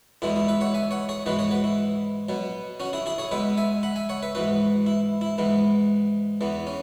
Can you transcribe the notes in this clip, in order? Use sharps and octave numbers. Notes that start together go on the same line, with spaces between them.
E2 B2 G#3 B3 E4
E4
B4 E5
C#5 F#5
E5 G#5
C#5 F#5
G#4 C#5
G#2 E3 G#3 B3 F#4 B4
G#4 C#5
F#4 B4
E4
B2 F#3 B3
C#4 F#4
E4 G#4
E4 G#4
G#4 C#5
B2 G#3 B3 B4 E5
E5 G#5
F#5 B5
E5 G#5
C#5 F#5
B4 E5
G#2 E3 B3 F#4 B4
E4
E4
G#2 E3 B3
E2 E3 B3
C#4